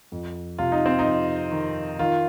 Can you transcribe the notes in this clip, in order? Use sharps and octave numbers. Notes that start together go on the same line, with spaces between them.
F2
C3 F4
D#4
C4
D#4
F2
D#3
D#3 F4